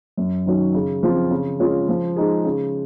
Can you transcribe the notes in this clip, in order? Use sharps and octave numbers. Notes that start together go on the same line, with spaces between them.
F#2
D#3 F#3 C#4
C#3
F3 C4 F4
C#3
G#3 C#4 F4 G#4
F3
G#3 D#4 G#4
C#3